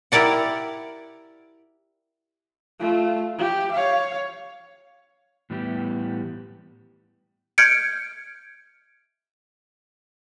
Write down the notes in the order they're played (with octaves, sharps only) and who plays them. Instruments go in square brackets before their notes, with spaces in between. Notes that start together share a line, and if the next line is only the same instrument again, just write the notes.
[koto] E4 G4 A#4 D5 F#5
[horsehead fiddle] A3 F4
G4
C#5 F5
[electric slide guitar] A2 E3 G3 B3 D4 G4
[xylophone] F6 G6 G#6 C#7 D7